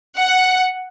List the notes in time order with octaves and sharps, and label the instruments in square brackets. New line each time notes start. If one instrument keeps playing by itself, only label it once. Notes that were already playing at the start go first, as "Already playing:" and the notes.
[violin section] F#5